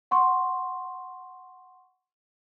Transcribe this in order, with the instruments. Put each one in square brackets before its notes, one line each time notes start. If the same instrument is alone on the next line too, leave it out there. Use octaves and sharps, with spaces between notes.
[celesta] F#5 C6 C#6